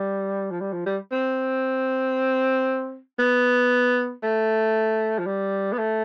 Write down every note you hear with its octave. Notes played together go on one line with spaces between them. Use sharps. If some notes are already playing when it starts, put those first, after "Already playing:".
Already playing: G3
F3
G3
F3
G3
C4
B3
A3
F3
G3
B3
A3